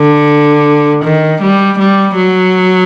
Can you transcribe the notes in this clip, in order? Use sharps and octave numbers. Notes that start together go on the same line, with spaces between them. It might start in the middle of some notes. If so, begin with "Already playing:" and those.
Already playing: D3
D#3
G3
G3
F#3